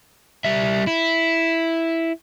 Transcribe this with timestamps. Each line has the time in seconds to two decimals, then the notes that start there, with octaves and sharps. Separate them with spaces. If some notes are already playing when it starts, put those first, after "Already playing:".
0.45 G3 E5
0.87 E4